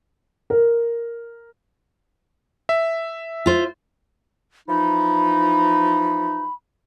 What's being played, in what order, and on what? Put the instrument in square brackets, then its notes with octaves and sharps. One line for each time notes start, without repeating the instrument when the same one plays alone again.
[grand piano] A#4
[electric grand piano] E5
[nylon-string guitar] F4 C5
[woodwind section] E3 F3 D#4 [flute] B5